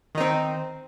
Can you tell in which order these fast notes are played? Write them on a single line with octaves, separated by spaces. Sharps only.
D#3 D#4 C4